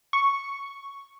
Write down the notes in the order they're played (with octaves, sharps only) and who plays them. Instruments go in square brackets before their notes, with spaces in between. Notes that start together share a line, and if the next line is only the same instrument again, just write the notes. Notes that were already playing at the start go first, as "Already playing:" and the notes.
[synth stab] C#6